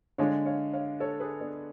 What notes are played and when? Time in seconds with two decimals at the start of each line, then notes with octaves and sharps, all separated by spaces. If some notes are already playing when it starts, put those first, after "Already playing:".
0.18 D3 G#3 D4 C#5 F5
0.46 C#5 F5
0.73 C#5 F5
1.00 A4 C#5
1.20 G#4 B4
1.40 B3 D4